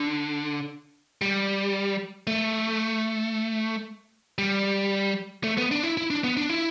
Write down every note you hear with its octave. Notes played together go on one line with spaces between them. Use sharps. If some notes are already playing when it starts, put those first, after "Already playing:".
Already playing: D3
G3
A3
G3
A3
B3
D4
E4
E4
D4
B3
D4
E4